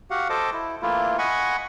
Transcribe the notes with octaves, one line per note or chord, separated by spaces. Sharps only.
F#4 G4 F5 F#5
A4 C5 D#5 A5 D6
E4
E3 A3 A#3 E4 F4
D#5 F#5 G#5 B5 C#6